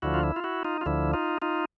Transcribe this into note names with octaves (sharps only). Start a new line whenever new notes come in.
D2 D3 F3 E4 F#4
F4
E4
F4
E4 F#4
D#4 F4
F4
D2 D3 F3 E4
D#4 F4
D#4 F4